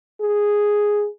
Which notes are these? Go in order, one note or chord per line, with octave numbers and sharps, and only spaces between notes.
G#4